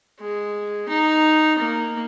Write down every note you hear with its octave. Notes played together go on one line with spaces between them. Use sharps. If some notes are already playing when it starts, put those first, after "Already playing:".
G#3
D#4
A#3